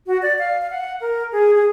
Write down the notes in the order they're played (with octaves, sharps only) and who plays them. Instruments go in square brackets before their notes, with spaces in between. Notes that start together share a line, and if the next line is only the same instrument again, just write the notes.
[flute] F#4
D5
F5
F5
F#5
A#4
G#4
G#4